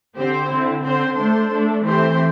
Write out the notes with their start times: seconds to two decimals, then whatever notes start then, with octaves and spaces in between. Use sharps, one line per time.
0.16 D3 C4 G4 C5
0.49 D3 C4 E4
0.83 D3 C4 A4 C5
1.16 A3 D4 A4 C5
1.50 A3 D4 A4
1.84 E3 A3 C4 G4 C5